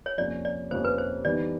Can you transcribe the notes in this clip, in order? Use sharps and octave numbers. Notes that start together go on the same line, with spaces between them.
C#5
F2 C3 F3 A#3 C#4 D5
D5
F2 C3 F3 A#3 C#4 C5
B4
C5
E3 G3 B3 D#4 D5